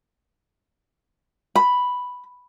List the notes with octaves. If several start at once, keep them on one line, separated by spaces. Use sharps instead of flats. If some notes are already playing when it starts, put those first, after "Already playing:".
B5